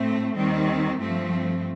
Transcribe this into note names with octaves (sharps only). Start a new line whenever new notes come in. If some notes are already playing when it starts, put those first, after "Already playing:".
Already playing: A2 A3 C4
D#2 D#3 G3 C4
G2 F3 A3 C4